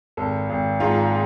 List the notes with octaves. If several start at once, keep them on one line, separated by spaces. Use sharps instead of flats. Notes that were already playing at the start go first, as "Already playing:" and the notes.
G#1 A4
G#1
G#2 F4